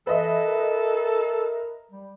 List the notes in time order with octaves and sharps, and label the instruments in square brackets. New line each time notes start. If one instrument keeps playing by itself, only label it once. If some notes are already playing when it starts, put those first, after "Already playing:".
[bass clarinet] E3 [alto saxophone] A4 [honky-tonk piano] B4 D#5 E5
[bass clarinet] A#4
G3